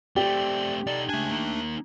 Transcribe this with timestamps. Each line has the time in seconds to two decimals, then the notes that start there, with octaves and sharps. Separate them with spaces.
0.16 A3 C4 G4 D5
0.87 D#4 A4 D5
1.09 C#2 A3 D4 G#5
1.31 A#3 D#4